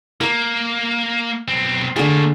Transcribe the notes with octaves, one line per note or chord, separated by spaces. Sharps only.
A#3 A#4 D6
B1 C4
D3 A3 A#3 G#4